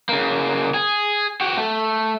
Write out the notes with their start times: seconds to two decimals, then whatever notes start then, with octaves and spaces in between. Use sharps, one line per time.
0.09 C#3 A#3
0.74 G#4
1.41 F#4 G4
1.57 A3